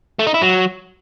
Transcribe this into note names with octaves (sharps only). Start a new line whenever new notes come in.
A3
D#4
E4
F#3